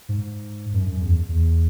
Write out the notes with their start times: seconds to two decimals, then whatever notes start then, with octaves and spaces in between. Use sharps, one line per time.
0.09 G#2
0.73 F#2
0.87 F#2
1.02 E2
1.29 E2